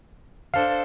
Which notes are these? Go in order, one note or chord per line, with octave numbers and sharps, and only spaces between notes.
D4 A4 C5 F5